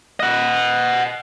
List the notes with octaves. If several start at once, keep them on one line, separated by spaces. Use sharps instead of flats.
D#5 F#5